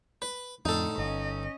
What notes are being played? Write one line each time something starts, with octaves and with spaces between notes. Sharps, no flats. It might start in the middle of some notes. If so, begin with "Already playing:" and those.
B4
F2 A2 D3 D#4 A4
G1 C#4 D#5